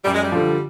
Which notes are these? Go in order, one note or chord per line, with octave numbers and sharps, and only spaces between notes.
F#2 G3
G#3
G3
D3 F3